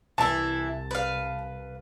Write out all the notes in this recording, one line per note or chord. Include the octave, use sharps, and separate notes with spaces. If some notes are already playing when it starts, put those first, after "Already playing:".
C2 E3 E4 A5
B4 F5